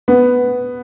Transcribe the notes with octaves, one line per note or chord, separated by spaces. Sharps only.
B3